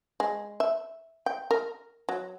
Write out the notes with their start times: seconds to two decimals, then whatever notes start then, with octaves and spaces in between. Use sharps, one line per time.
0.20 G#3
0.60 E5
1.26 G5
1.51 A#4
2.09 F#3